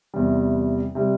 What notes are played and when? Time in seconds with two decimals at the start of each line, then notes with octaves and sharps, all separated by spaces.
0.14 E2 C3 G3
0.95 C3 G3